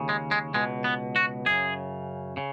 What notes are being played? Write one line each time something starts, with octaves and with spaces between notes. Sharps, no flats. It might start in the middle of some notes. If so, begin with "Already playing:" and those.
Already playing: D#2 C#3
G#3
G#3
C#2 B2 G#3
B3
F#4
F#2 C#3 G#4
C#3